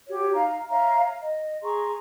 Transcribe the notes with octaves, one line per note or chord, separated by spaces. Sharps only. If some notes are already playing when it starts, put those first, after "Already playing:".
F#4 G4 C#5
D#4 F5 A#5
C#5 E5 F5 A#5
D#5
G#4 A#5 C6 C#6